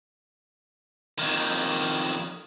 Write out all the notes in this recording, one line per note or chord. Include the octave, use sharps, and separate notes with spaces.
F2 D#3